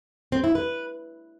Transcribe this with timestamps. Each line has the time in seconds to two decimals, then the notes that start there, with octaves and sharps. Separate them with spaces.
0.32 C4
0.44 E4
0.55 B4